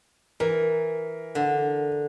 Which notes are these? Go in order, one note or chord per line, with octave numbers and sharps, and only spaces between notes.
E3 A#4
D3